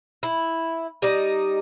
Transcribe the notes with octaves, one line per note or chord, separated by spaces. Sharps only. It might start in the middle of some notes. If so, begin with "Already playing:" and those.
E4
G3 D#4